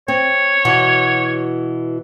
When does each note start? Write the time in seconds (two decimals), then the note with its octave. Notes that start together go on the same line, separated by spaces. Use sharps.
0.08 C4 C#5
0.65 B2 E3 F#4